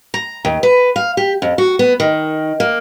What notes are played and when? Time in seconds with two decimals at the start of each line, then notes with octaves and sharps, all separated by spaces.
0.14 A#5
0.45 D#2
0.63 B4
0.96 F5
1.17 G4
1.42 F2
1.58 F#4
1.79 B3
2.00 D#3
2.60 A#3